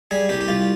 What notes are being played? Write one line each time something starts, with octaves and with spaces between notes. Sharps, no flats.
G3 G#4
C2 G4
G4
C2 F4